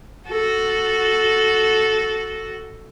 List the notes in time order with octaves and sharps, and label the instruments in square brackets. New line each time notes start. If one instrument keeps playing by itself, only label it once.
[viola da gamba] F#4 A4